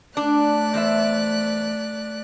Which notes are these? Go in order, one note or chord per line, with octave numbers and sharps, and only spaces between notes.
A3 D4 D5 F#6
E2 C5 E5